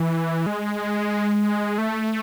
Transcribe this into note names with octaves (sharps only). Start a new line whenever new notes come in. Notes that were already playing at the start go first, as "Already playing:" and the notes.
Already playing: E3
G#3
A3